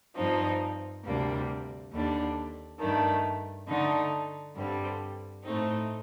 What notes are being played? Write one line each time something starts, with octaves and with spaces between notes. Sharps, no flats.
G2 F3 C4 D#4
D2 C3 G3 A#3 D4
D#2 D3 G3 D4
G2 D#3 A3 D4
D3 A3 D#4
G2 D3 G3 C4
A2 A3 C4 D#4